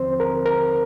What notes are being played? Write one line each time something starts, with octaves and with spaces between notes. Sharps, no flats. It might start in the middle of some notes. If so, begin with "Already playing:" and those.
Already playing: D#2 D3 F3 C4 C5
A#4
A#4